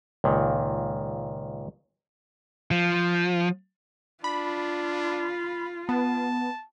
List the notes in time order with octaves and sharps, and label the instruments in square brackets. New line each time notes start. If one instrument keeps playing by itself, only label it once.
[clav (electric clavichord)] C#2 A#2 D#3
[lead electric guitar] F3
[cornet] D4 [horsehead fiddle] F4 [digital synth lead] B5
[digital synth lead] B3 [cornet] A5